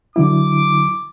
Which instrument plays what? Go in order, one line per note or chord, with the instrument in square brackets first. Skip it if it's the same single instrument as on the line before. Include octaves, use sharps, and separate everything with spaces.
[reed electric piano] D3 F#3 E4 [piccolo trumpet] D6